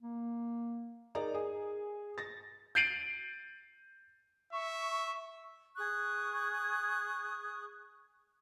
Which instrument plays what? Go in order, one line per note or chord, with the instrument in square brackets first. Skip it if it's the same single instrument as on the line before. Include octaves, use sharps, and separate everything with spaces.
[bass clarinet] A#3
[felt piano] D#4 G#4 A#4 D5 A#5
G#4
A6 A#6
[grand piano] G6 A6 C7 D7 D#7 F#7
[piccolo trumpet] E5 [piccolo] C#6
[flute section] G#4 C#6 D#6 F#6